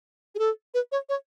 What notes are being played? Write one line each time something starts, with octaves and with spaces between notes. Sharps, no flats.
G#4
A4
B4
C#5
C#5